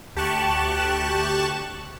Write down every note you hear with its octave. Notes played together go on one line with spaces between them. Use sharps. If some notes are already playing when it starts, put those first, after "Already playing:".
D2 G4 A5 C#6 F#6 E7